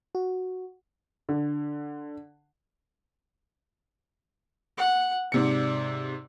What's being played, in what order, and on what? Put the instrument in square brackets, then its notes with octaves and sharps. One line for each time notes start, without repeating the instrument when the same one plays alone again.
[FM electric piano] F#4
[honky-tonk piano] D3
[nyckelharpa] F#5
[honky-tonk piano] G#2 C3 C#7 [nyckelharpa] D5